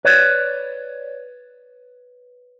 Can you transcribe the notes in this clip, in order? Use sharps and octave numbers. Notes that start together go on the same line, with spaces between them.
B4 C#5 D5